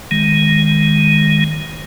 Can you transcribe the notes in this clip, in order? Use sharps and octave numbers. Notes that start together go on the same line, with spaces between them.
D#3 G#3